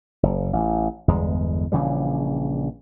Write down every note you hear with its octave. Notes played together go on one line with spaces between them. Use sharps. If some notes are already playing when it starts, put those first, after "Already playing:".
F#1
A1
G1 E2 G#3
A#1 C#3 E3 G3